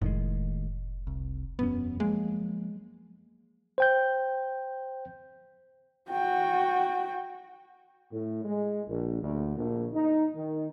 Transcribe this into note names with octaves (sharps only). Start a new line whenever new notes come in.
F1 A2 D#3 G#3
C2
E1 F#2 B3 C#4
F3 F#3 G#3 A#3
C5 G5 G6
F#4 G5
A2
G#3
A#1
D2
A#1
D#4
D#3